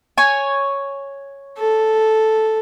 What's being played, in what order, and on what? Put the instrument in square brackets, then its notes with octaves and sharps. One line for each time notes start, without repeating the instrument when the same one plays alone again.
[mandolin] C#5 G#5
[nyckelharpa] A4